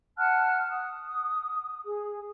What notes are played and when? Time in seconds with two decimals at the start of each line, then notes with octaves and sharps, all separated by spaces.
0.18 F#5 A5 F6 F#6
0.70 D#6
1.85 G#4